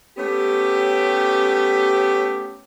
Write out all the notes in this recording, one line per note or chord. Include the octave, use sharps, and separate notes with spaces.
A3 B3 C#4 G4